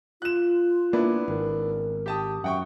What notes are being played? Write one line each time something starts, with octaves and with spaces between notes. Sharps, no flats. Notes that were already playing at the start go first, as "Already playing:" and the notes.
F4 F#6 E7
A#3 B3 D4 E4
G#1 A#4
G4 A5 D#6
F#2 E5 F#5 G5 C#6